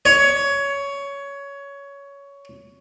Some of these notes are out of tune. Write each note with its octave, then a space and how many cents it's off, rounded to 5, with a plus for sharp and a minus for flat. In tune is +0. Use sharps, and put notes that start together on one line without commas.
C#5 +15